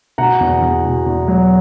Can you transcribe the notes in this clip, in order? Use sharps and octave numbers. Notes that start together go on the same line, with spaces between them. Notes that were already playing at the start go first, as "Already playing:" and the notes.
B2 F#5 A#5
E2
E2
B2
E2
F#3